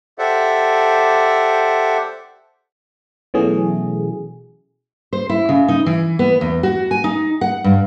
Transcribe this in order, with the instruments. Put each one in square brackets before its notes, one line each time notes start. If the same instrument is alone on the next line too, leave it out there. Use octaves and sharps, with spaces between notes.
[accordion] G4 A4 C5 D5 E5 F#5
[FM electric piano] B2 E3 F#3 A3 C#4 G#4
[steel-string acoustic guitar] C5
E4
C#3
D#4
E3
B3
E2
F#4
G#5
D#4
F#5
G2